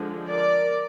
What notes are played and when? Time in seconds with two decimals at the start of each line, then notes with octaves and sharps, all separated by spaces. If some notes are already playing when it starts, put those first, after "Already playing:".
Already playing: D3 F3 G#3
0.29 A#4 D5